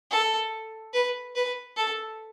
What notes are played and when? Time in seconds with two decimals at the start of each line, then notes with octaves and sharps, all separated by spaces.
0.11 A4
0.93 B4
1.35 B4
1.77 A4